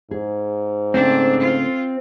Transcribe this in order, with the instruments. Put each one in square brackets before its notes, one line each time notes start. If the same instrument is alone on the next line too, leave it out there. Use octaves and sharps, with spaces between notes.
[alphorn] G#2 [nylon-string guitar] G#4
[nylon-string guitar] C#3 A3 [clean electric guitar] C4 [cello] D4
[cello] F4